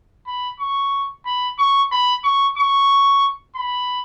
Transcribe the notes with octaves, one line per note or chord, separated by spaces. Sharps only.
B5
C#6
B5
C#6
B5
C#6
C#6
B5